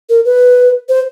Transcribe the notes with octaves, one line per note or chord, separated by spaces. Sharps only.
A#4
B4
C5